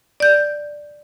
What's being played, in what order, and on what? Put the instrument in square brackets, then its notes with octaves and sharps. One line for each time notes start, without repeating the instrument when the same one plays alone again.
[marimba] D5 G6